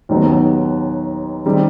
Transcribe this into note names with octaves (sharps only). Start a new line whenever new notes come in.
D#2 D#3 F#3 B3
D#3 G3 C4